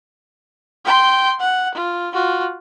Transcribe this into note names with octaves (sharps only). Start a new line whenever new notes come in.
G5 C6
F#5
F4
F4 F#4